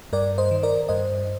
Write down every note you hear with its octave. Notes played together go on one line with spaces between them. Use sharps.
G2 A#4 D5
C5 D#5
D#3
A#4 D5
G2 C5 D#5